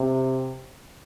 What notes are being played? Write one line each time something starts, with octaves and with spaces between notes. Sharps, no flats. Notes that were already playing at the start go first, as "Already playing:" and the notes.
Already playing: C3